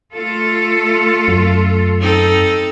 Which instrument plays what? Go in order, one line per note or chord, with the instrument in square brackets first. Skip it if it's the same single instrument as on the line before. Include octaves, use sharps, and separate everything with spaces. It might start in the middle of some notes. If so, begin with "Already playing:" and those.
[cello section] A3 F4 A4
[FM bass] F#2
[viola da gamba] C4 D#4 A4